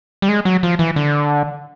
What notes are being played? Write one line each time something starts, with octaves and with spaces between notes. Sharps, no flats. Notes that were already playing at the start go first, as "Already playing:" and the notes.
G3
G#3
F#3
F3
E3
D3